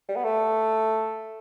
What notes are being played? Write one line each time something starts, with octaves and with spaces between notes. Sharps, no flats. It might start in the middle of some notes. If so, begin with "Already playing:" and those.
G3
B3
A3